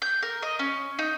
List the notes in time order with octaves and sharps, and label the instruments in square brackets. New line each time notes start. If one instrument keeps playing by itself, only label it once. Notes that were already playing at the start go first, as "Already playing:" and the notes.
[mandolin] G6
A#4
D#5
C#4
D#4